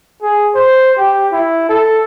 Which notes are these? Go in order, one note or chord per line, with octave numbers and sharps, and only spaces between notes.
G#4
C5
G4
E4
A4